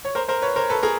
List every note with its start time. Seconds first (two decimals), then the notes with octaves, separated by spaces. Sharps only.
0.05 C#5
0.15 A#4 C5
0.28 A#4 C5
0.42 B4 C#5
0.56 A#4 C5
0.69 A4 B4
0.83 G#4 A#4